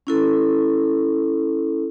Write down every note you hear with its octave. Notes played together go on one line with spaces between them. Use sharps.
C#4 E4 A4